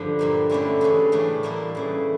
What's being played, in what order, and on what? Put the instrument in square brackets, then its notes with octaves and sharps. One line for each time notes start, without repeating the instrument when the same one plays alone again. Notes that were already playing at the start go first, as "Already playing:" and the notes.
Already playing: [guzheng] G2 D3 F3 F4
A#2 G3 A#3
D3 A3 C#4 E4
C#3 E3 G3 C#4
A2 E3 A3 D4
A2 G3 A#3 E4
C#3 E3 A3